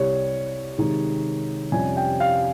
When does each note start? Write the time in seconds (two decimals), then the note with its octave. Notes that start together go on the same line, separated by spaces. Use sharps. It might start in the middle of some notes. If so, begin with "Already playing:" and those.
Already playing: C2 C3 G3 C#5
0.78 C3 D#3 G#3 D#4
1.72 F2 C3 G3 C#4 G#5
1.97 G5
2.20 F5